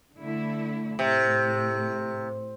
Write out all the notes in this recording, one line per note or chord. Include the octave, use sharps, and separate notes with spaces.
D3 A3 E4
A2 C3